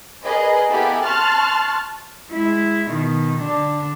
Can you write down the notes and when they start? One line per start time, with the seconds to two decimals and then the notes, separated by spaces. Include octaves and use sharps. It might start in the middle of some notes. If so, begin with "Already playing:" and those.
0.24 G#4 A#4 B4 D5 D#5 G#5
0.70 A#3 B3 E4 G4 A4 G#5
1.03 A5 C6 C#6 F6 F#6 A6
2.32 G#3 E4
2.91 B2 D#3
3.39 D3 D4